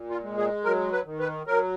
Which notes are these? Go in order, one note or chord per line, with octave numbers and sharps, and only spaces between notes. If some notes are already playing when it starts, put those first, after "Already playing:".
Already playing: A#2
F4
G#3
G#4
F#3 A#4
B4
D#3
B4
F#3 A#4